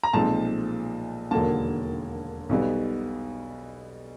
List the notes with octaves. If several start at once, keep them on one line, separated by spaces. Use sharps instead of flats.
A#5
B1 A#2 F3 G#3 C4 A5
E1 D#2 D3 F#3 A#3 A5
B1 B2 G3 B3